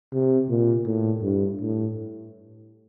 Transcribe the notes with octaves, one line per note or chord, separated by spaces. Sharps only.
C3
A#2
A2
G2
A2